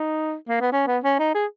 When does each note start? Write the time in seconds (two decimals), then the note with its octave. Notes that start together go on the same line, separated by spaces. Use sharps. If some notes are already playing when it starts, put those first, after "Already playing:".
Already playing: D#4
0.49 A#3
0.61 B3
0.72 C#4
0.87 B3
1.04 C#4
1.19 D#4
1.34 G#4